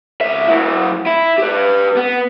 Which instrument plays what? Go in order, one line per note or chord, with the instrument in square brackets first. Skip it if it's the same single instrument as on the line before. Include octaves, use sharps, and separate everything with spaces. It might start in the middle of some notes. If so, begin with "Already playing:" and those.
[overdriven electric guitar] C#2 E5
F#3 E4
E4
G4 B4
B3